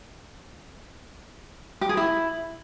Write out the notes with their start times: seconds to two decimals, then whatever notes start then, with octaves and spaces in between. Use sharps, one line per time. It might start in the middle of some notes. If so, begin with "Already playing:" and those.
1.81 G4
1.89 G#4
1.97 E4